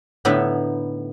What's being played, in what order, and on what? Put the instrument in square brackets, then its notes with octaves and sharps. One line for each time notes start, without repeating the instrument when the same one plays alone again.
[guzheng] A2 D3 B3 D#4 E4 E5